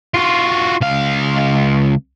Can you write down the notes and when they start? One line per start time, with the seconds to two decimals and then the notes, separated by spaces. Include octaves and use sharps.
0.14 F4 F#4
0.81 C#2 F5